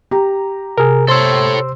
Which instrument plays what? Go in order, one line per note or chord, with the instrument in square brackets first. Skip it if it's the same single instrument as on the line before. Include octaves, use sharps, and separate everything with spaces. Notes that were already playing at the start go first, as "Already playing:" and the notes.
[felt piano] G4 A#5
[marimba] C3 [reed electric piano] G#4 A#4
[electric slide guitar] A4 C#5 [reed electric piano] C5 C6 E6